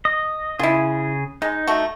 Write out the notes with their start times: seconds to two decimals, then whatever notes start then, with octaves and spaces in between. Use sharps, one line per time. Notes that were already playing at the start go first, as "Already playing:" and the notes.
0.05 D#5
0.59 C#3 E4 F4 G#4
1.42 G#3 D#4
1.67 A3 F#4